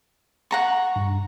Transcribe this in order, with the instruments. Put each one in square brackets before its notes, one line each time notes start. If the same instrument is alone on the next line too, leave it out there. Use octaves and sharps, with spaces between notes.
[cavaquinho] F#5 A#5 C#6
[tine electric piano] G2